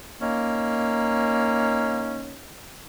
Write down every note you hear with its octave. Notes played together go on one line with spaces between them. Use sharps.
A#3 C#4 D#4